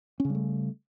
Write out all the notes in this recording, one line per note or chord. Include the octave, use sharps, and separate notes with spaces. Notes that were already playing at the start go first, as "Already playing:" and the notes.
C#3 G3 A3 C#4